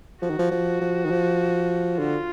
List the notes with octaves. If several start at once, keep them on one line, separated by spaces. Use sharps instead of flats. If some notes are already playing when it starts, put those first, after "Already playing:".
F3 F#4
D#3
F3
F3
F3
D#3
F3
D3 F4